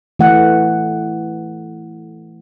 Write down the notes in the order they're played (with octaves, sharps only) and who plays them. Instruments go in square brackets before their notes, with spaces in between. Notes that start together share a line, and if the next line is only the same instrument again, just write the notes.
[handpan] E3 A3 F#5